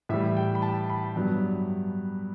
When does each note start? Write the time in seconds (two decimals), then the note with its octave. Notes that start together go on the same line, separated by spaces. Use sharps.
0.09 A2 E3 G3 E5
0.37 G5
0.55 B5
0.62 A5
0.89 B5
1.16 G2 F#3 B3